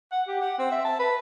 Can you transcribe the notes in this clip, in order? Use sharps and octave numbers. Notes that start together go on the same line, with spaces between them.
F#5
G4
F#5
C4
E5
A5
B4